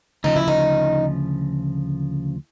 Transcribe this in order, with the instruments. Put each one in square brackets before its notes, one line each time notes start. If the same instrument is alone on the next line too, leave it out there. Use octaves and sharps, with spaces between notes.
[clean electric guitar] D2 C#3 F3 [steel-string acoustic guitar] D#4
[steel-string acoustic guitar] E4
D#4